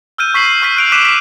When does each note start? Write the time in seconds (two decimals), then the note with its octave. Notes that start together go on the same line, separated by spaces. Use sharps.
0.18 E6 F6 G6 D#7
0.34 C#6 B6 C7 F#7
0.62 C#6 F6 B6 D#7
0.77 F#6 D7 F7
0.92 D6 F#6 B6 D#7 E7
1.05 B6